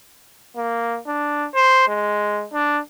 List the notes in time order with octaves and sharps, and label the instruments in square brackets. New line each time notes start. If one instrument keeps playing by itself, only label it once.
[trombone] A#3
D4
C5
G#3
D4